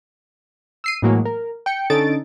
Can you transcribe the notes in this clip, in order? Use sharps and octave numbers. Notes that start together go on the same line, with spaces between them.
E6 C7 D#7
A2 E3 F#3 G#3 A#3
A#4
G5 C#7
D3 C#4 D#4 A4 A6 D7